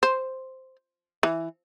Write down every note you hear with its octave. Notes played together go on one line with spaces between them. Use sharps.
C5
E3